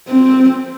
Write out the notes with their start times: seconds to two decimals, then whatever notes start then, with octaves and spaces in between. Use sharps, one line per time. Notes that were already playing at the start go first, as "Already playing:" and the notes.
0.08 C4